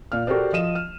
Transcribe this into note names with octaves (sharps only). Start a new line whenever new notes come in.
A#2 F5 F6
F#4 G4 A4 A#4 C5 D5
F3 D#5 D#7 E7
F6